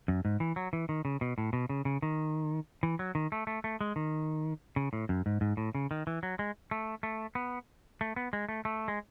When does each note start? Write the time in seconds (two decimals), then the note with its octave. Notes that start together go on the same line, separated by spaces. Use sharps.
0.08 F#2
0.25 G#2
0.40 E3
0.56 F#3
0.73 E3
0.89 D#3
1.05 C#3
1.21 B2
1.38 A2
1.53 B2
1.69 C#3
1.85 C#3
2.02 D#3
2.83 E3
2.99 F#3
3.15 D#3
3.32 A3
3.47 A3
3.64 A3
3.81 G#3
3.96 D#3
4.76 C#3
4.93 A2
5.09 F#2
5.26 G#2
5.41 G#2
5.57 A2
5.75 C#3
5.91 D#3
6.07 E3
6.23 F#3
6.39 G#3
6.71 A3
7.03 A3
7.35 B3
8.01 A3
8.16 B3
8.33 G#3
8.49 A3
8.65 A3
8.88 G#3